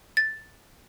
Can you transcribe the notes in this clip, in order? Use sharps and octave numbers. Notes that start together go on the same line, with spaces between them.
A6